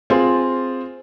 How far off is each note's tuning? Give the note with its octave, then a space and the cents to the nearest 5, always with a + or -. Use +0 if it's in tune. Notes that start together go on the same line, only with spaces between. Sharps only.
C4 +0 F4 +0 G#4 +0